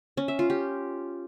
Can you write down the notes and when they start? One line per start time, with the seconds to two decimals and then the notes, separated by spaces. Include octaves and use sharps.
0.17 C#4
0.28 E5
0.39 F4
0.50 G4